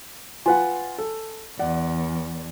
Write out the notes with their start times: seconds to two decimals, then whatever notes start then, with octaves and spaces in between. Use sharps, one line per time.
0.46 F4 B4 F#5 G#5
0.98 A4
1.59 E2 D5 F#5